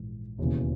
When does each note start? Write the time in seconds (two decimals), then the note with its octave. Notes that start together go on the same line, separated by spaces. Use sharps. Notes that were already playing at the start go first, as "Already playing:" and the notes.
Already playing: A#1 G#2 E3
0.38 E1 D#2 C#3 E3